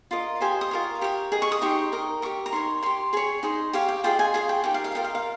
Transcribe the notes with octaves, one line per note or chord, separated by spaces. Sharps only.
F4 A#4 D#5
G4 C5 D#5 G#5
D#6
F4 A#4 C#5
G4 A#4 C#5
G#4 D#5
C#6
D#6
D#4 G4 C5 C#6
D#4 A#4 D#5
G4 A#4 D#5 C#6
A#5
D#4 A#4 C#5 C6
G4 C#5 C6
G#4 C#5 G#5
D#4 G#4 C5
G4 C#5 F5
G5
F4 G#4 D#5 G5
G#5
F4 G#4 C#5 G#5
G5
D#4 G4 A#4 G5
F5
F5
F4 A#4 D#5 G5
F5
F5